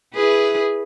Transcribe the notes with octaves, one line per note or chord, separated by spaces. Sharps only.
E4 G#4 B4